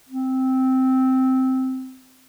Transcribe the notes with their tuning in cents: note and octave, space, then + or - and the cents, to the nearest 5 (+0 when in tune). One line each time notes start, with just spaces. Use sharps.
C4 -5